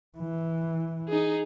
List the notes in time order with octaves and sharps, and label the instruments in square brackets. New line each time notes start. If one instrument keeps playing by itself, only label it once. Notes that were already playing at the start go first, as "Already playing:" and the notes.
[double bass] E3
[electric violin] D#4 G#4